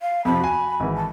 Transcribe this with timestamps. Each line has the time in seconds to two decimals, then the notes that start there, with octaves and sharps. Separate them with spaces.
0.02 F5
0.25 F2 C3 F3 B5
0.40 F#4 G#5
0.80 G#1 E3
0.96 A5